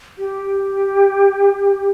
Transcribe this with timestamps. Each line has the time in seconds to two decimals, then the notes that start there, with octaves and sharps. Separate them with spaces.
0.18 G4